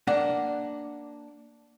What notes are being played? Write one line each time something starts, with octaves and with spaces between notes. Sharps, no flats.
A#3 D4 F#5